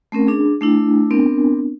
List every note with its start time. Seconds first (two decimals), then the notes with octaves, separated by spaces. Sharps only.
0.12 A3 C4 C#4 A#4
0.27 D4 G#4
0.61 A3 D4 E4
1.11 B3 C4 D4 A#4